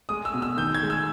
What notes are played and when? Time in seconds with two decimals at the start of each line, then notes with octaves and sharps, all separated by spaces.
0.09 G#3 D#6
0.25 E6
0.34 B2
0.42 E6
0.57 D#3 G6
0.75 G#6
0.83 G#3
0.90 E6